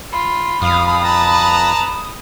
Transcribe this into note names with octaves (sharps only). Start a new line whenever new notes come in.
F4 B5
F2 F5 D#6
B4 A5 A#5